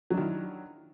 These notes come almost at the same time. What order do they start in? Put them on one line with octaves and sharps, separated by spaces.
F#3 D4 D#3 E4